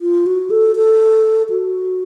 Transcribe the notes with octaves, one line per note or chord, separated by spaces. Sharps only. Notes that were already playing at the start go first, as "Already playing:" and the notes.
F4
F#4
A4
A4
F#4